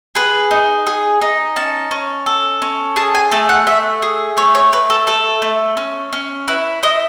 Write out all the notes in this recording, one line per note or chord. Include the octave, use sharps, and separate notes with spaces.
G#4 B4
D#4
G#4
D#4
C#4 A5
C#4
A4
C#4
G#4 A5
G#5
A3 A4
F#5
A3 E5
G#4
A3 C#5
C#5
A3 B4
A4
A3 A4
A3
C#4
C#4
E4 B4
E4 D#5